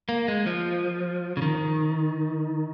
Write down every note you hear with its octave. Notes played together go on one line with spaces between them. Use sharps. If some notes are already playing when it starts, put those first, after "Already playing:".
A#3
G#3
F3
C#3
D#3